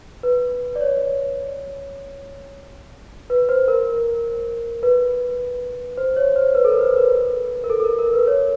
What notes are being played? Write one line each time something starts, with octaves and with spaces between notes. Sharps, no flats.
B4
D5
C#5
B4
C5
A#4
B4
C5
C#5
C5
B4
A4
A#4
C5
B4
B4
A#4
A4
A4
A#4
A#4
B4
C#5